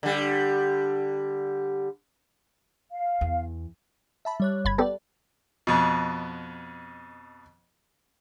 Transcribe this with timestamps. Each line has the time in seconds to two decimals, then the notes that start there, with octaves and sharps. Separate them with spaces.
0.03 D3 G3
2.93 F5
3.21 E2
4.25 E5 A5 B5
4.40 G3 C#5 F#6
4.65 G1 B5 G#6
4.78 B3 G4 A4 B4 D5
5.67 F2 B2